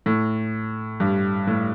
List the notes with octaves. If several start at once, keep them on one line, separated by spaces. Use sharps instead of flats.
A2
G2
A2